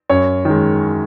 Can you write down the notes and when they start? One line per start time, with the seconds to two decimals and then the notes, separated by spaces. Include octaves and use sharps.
0.10 F#2 C#5
0.45 D#3 G#3